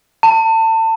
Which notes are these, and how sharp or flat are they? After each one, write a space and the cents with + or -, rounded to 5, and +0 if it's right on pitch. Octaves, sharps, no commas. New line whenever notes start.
A5 +30